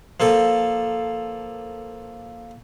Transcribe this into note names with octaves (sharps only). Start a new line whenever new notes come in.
F3 A#3 A4